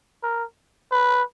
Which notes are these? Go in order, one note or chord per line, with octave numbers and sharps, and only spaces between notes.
A#4
B4